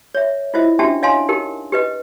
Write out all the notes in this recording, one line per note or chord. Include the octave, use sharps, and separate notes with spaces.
C#5 E5
E4 F4 C5 D#5 E5
C#4 D4 F#4 G4 E5 A5
C#5 D#5 F5 G#5 A5 C6
D#4 G4 A#4
G4 B4 D#5